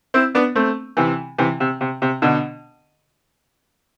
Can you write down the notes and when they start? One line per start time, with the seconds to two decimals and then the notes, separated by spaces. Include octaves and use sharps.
0.14 C4 E4
0.35 B3 D4
0.55 A3 C4
0.97 C3 E3
1.38 C3 E3
1.60 C3
1.81 C3
2.02 C3
2.22 B2 D3